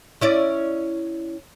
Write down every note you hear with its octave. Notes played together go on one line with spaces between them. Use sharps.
C#4 E4 D5